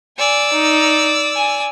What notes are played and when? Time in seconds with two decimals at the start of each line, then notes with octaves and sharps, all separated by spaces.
0.18 D5 G#5 E6
0.53 D#4
1.35 G#5